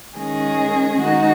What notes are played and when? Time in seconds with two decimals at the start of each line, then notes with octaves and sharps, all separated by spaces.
0.18 D#3 G#3 C#4 G#4
1.00 D#3 G#3 D#4 F#4